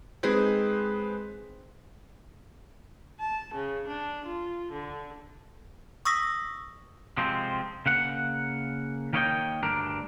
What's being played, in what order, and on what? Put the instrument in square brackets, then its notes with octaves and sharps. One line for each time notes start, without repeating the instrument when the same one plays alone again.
[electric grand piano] G#3 B4 C5 [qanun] C4 D#4 G#4
[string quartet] A5
C#3
D4
F4
D3
[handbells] C#6 D#6 E6 A#6 B6
[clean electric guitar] C3 F3 G#3 C4
C#3 A#3 F#5
D#3 A#3 B3 C#5 D#5 G5
D2 G2 D4 A#4